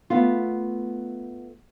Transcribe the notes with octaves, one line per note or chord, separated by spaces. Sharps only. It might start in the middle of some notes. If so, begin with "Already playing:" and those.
A3 B3 F4